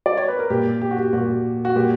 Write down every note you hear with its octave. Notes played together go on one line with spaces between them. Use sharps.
D5
C#5
B4
A#4
A#2 G4
G4
F#4
G4
A#2 F#4
F#4
A#2 G4